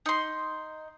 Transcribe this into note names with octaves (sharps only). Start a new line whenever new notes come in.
D#4 C6